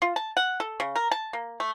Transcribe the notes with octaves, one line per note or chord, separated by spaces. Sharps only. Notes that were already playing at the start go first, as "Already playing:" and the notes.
F4
A5
F#5
A4
C#3
A#4
A5
A#3
A3